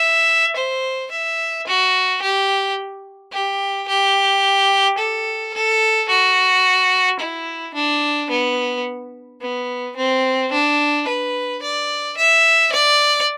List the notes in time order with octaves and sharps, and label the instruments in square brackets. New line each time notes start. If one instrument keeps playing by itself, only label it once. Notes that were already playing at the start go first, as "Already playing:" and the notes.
Already playing: [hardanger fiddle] E5
C5
E5
F#4
G4
G4
G4
A4
A4
F#4
E4
D4
B3
B3
C4
D4
B4
D5
E5
D5